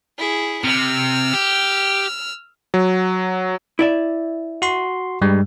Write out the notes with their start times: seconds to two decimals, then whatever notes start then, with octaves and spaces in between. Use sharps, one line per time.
0.18 E4 G#4
0.64 C3 E6 F6
1.34 G4
2.74 F#3
3.79 E4 D5 E5
4.62 F#4 C6
5.21 G2 G3 G#3